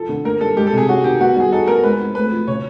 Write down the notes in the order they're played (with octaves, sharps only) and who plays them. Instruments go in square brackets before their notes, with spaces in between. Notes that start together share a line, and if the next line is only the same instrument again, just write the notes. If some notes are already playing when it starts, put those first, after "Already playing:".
Already playing: [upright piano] F3 [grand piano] A4
[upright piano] D3
[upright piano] A#3 [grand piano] A#4
[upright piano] G3 [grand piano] A4
[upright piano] G#3 [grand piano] G4
[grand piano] A4
[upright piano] C3 [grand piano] G#4
[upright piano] C#4 [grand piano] F#4
[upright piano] D#3 [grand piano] G4
[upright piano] B3 [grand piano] F#4
[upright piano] G3 [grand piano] G#4
[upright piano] D#4 [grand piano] A4
[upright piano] B3 [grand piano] A#4
[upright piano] G#3 [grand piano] B4
[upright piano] C4
[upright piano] A3 [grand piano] B4
[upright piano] F3
[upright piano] C#3 [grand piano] C#5